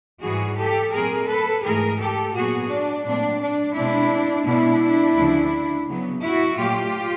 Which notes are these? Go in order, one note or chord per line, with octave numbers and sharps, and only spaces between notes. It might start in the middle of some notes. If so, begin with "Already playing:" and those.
G#2 E3 G3 F#4 G#4
G4 A4
A#2 F#3 A3 C4 G#4 A#4
A4 B4
G#2 E3 A3 G#4 A#4
G4 A4
A#2 F#3 B3 F#4 G#4
D4
A#2 F#3 A3 C4 D4
D4
B2 G#3 C4 D4 E4
B2 G#3 B3 D4 E4
D2 C#3 F3
C#3 F#3 B3
E4 F#4
A#2 F#3 A3 F4 G4